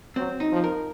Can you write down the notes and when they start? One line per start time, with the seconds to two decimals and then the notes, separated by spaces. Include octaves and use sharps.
0.16 F#3 C4
0.40 D#4
0.52 F3
0.64 A#4